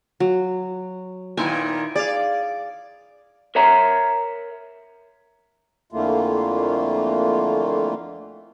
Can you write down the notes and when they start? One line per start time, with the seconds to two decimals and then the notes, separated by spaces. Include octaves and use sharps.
0.20 F#3
1.37 A#2 D#3 B3 E4 G#5
1.95 G#4 D5 F5
3.55 A#4 C#5 E5 A#5
5.92 F2 D3 E3 A3 A#3 F4